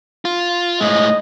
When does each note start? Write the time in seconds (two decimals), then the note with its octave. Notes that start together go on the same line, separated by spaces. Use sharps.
0.25 F4
0.80 A2 G#3 D#5